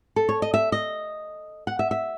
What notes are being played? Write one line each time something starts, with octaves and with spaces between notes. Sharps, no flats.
A4
C#5
D#5
E5
D#5
F#5
E5
E5